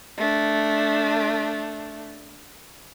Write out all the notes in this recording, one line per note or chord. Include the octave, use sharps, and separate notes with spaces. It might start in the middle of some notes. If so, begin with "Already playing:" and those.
A3 D4